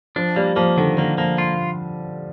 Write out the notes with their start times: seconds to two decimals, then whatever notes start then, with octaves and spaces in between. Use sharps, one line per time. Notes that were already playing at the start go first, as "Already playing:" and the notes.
0.16 F3 D4
0.36 G3 A#3
0.56 F3 A#3
0.77 D3 D#3
0.97 D3 A#3
1.18 F3 A#3
1.38 F4